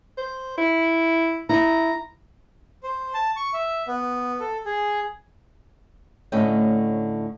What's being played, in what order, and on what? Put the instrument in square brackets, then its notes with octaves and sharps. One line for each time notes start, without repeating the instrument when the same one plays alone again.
[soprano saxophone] C5
E4
[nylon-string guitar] E4 [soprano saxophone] A#5
[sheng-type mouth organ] C5
A5
C#6
E5
B3
A4
G#4
[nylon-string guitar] A2 D3 A3 C#4 D#5 G5